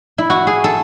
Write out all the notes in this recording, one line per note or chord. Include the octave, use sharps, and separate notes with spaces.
E4
F#4
G#4
A4